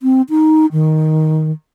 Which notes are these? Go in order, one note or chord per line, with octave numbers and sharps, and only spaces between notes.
C4
D#4
D#3